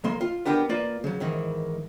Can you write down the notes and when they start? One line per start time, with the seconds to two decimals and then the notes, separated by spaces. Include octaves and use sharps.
0.04 B1 A#3 C6
0.21 F4
0.45 B3 D4 G4 A#4 G5
0.69 A#3 F4 B4 D5
1.04 C#3 F#3
1.20 G#2 D#3 E3